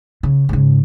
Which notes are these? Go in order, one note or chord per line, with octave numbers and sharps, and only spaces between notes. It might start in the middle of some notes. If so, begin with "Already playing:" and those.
C#3
G#2 C#3